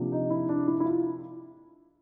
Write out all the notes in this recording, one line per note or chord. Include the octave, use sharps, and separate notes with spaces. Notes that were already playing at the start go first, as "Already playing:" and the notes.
Already playing: C3 F3 A#3 D4
D#4
E4
D4
E4
E4
F4